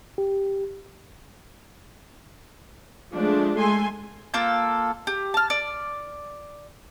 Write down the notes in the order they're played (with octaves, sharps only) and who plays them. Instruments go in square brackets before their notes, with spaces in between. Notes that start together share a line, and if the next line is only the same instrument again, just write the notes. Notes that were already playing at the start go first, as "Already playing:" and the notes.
[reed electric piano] G4
[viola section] F3 G#3 A3 D4
G#3 A3 A4 G#5 C6
[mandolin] A#3 F4 A4 G6
G4
A5 F6
D5